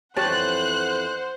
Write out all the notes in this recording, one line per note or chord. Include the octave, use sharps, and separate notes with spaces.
F2 E3 G4 C5 C#5 F#5 A5 F#6